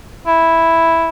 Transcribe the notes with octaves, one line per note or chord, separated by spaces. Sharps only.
E4